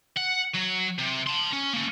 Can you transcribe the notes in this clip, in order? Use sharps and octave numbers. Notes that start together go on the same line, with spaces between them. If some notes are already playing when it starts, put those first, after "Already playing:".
F#5
F#3
C3
A5 C6
C#4
A#3 C#4